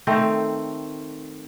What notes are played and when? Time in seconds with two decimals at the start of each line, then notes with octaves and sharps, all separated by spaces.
0.07 D#3 A3 C4